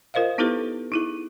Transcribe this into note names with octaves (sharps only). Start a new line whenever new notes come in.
F4 A#4 C5 D#5 F5
B3 D#4 E4 G4 A4 B4
D#4 E4 G#4